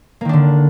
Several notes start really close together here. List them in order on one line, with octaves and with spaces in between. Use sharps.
A#3 D#3 D4 D3